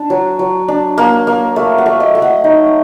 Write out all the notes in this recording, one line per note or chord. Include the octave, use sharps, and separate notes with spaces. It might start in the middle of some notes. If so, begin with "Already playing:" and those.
Already playing: D4 A5
F#3
F#3
D4
A#3
A#3
A3
F#5
A3
D#5
A3
F#5
D#4